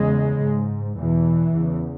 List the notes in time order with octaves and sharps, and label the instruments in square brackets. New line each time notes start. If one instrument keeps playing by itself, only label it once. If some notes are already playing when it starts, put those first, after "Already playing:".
Already playing: [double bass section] E2 C#3 G#3
G#2
E2 B2 E3
E2 C#3